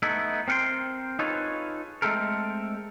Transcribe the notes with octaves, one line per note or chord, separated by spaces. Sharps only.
A3 B3 D#4 E4
C4 A#4 F#5 G5 C6
D#4 F4 G#4 A4 B4 C#5
G#3 A3 C4 A4 A#4